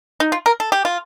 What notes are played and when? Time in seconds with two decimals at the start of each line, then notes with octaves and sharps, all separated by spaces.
0.20 D#4
0.32 F4
0.46 A#4
0.60 A4
0.72 G4
0.85 F4